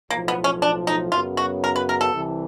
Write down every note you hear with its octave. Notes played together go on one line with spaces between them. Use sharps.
B1 A2 F3 A#3
B3
C#4
D4
D#4
F#2 C#3 F#3 B3 F4
F#4
A#4
B4
A#4
A4
C2 C3 E3